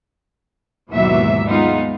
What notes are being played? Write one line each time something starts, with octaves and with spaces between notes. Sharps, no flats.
D#2 G#2 B2 E3 F#3 E5
G#3 B3 D#4 F4